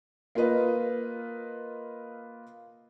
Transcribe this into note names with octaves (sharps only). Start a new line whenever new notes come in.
A#3 F4 B4 D#5